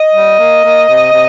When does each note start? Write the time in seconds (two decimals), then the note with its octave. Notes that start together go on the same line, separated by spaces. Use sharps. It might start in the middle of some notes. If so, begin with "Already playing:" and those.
Already playing: D#5
0.13 G3
0.38 A#3
0.63 A#3
0.88 C3
1.13 C3